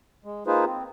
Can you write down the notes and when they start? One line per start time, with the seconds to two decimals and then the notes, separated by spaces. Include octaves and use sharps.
0.25 G#3
0.47 A#3 D#4 F4 G#4 B4 C5
0.66 C4